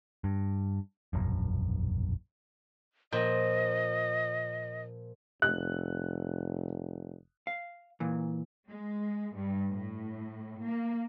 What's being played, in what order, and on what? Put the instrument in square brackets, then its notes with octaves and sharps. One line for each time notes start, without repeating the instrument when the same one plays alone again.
[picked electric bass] G2
E1 A#1 F#2
[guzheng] A#2 F3 [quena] D#5
[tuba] F1 [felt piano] F#6
[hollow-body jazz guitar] F5
A#2 E3
[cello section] G#3
G2
A2
A#3